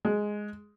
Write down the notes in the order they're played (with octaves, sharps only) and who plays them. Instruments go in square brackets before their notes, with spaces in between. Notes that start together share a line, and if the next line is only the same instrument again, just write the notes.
[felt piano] G#3